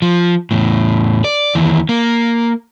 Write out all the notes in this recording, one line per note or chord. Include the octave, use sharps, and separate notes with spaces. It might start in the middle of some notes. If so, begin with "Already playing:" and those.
F3
E2 A2
D5
D#2 E3
A#3